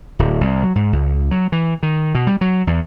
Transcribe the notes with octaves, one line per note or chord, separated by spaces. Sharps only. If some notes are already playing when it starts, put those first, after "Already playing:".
D1
C2
F#3
G#2
C#2
F#3
E3
D#3
B2
G3
F#3
E2